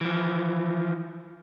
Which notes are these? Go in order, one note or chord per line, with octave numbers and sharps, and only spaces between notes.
E3 F3